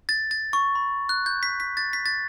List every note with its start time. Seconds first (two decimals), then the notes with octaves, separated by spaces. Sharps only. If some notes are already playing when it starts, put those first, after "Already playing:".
0.09 A6
0.31 A6
0.53 C#6
0.75 B5
1.09 F#6
1.26 G6
1.43 B6
1.60 B6
1.77 A6
1.93 B6
2.06 A6